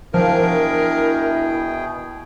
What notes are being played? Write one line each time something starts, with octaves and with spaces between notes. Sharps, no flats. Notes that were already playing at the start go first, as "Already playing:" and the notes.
B2 F3 D4 E4 G#4 A#4 G5